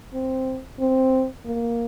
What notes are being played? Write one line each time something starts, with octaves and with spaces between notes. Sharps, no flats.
C4
C4
A#3